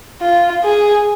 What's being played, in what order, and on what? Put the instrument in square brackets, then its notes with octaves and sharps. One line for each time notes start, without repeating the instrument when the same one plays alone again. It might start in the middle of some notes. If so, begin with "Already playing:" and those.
[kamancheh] F4
G#4